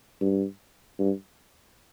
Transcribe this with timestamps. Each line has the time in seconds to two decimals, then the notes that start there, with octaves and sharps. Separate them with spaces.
0.21 G2
0.99 G2